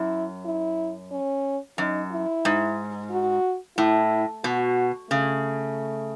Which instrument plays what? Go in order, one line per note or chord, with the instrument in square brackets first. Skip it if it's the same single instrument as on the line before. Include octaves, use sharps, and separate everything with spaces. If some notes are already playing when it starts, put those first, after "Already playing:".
Already playing: [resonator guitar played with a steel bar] F#2 [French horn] E4
[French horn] E4
C#4
[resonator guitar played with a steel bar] F#2 [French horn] D#4
[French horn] E4
[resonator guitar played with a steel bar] G#2
[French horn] F#4
[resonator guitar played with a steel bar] A2 [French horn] E4
[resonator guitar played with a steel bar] B2 [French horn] F#4
[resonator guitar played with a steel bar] C#3 [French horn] A3